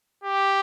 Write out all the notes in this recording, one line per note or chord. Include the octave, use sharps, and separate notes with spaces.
G4